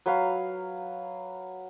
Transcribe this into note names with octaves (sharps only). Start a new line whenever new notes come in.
F#3 B4 F5